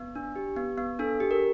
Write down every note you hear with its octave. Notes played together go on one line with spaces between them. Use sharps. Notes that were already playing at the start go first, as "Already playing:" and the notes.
Already playing: B3
D4
G4
B3
B3
D4 A4
G4
A#4